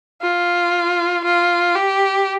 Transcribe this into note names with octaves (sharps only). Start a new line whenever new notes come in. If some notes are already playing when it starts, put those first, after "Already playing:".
F4
F4
G4